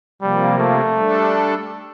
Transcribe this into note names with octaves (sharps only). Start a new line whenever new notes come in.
C3 F3 G3 A#3
A3
G3 D4 A4